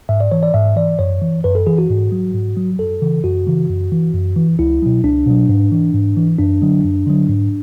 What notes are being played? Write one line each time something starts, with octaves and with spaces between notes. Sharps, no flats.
G#2 E5
D5
E3 C#5
D5
G#2 E5
E3 D5
F#2 C#5
E3
F#2 B4
A4
E3 G#4
F#4
G#2
F#3
G#2
F#3
F#2 A4
C#3 E3
F#2 F#4
C#3 E3
F#2
E3
F#2
E3
C#2 E4
B2 F#3
C#2 D4
B2 F#3
G#2
E3
G#2
E3
F#2 D4
D3 F#3
F#2
D3 F#3
G#2